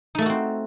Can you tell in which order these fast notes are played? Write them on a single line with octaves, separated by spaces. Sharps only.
D#4 A3 A4 F#4 C4